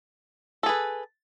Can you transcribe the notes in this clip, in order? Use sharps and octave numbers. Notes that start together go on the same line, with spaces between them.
G#4 A4 B4